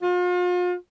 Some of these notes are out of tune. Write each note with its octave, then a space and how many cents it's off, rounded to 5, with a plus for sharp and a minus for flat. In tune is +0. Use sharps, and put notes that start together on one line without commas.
F4 +40